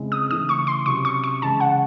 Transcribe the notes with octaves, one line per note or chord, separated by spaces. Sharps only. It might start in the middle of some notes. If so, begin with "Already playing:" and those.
Already playing: C#3 G#3 C4 E4
D#6
C#3 E3 A3 D#6
C#6
C6
C3 F#3 C#4 C#6
C#6
C#6
C#3 E3 G#3 C#4 E4 A5
F#5